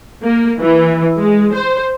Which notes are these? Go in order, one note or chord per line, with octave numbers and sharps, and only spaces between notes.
A#3
E3
G#3
C5